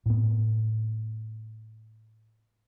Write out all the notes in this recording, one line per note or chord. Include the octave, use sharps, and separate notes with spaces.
A2 B3